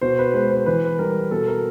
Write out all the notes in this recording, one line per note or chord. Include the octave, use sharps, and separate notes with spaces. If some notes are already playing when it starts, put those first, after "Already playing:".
B2 C5
B4
G#3 C5
C5
E3 B4
G3 A#4
B2 A4
A#4